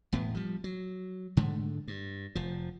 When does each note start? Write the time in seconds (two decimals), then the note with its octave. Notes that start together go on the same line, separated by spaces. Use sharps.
0.12 E1 A2 B3
0.35 F3 G3
0.64 F#3
1.37 G#2 D3 G#3 A3
1.88 G2
2.35 F1 F3